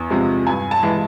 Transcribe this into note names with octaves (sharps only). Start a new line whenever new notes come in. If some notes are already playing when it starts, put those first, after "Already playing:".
Already playing: E2
C3 F3 G#3
G2 G#5
A5
E3 G#3